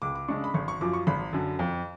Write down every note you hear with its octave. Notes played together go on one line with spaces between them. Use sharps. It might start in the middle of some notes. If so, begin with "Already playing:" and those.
C#2 D6
D6
C#3 G#3 D4 C#6
B5
G#1 C#6
C#6
F#2 F3 D6
C#6
G#1 B5
F#2 D3
F2